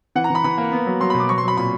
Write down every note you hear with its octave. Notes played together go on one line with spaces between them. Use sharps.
E3 F#5
A#5
E3 B5
E3 B5
A#3
B3
F#3
F#3 C6
B2 B5
D6
F#3 C#6
C6
F#3 B5
A#2 B5